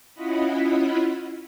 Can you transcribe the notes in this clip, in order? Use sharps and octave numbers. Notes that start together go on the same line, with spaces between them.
C#4 E4 F4 D#5 F#5 B5